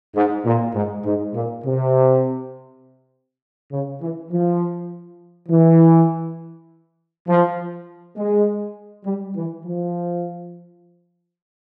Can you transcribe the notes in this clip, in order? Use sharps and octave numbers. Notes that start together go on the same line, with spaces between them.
G#2
A#2
G#2
G#2
A#2
C3
C#3
E3
F3
E3
F3
G#3
G3
E3
F3